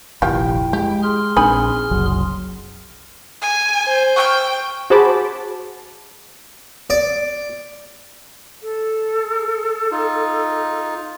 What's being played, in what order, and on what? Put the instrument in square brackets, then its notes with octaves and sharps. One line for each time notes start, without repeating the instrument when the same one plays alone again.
[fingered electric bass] F1 A#1 D#2 [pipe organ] E4 G5 [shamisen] F4 G4
[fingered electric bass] G#3 [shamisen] G4
[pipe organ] G#4 C6 F6
[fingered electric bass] A#1 C4 D4 [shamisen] D#4 G#5 B5
[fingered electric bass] F#1 C2 F#3
[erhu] G#5
[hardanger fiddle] C5
[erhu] G5 [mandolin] C#6 E6 F6
[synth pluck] F#4 G#4 C5 A5 B5 D6
[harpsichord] D5
[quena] A4
[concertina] D#4 F4